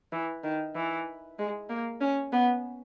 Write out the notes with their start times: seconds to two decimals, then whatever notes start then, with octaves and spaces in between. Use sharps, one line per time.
0.12 E3
0.44 D#3
0.75 E3
1.38 G#3
1.70 A#3
2.01 C#4
2.33 B3